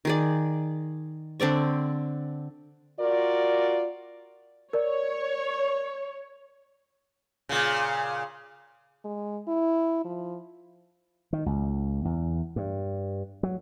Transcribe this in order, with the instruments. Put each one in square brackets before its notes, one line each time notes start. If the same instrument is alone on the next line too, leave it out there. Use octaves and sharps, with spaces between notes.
[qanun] D#3 G#4 D5
D3 C4 D5 C#6
[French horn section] F4 F#4 A#4 D5
[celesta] A#4 D5 [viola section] C#5
[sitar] A#2 C#3
[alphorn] G#3
E4
F3
[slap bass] D#3
C#2
E2
G2
F#3